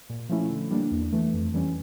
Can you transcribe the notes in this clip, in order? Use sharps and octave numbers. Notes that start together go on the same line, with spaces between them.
A#2
F3 A3 C#4 E4
D3
G3 A#3 D4
E2
E3 A3
F2
E3 G3 C#4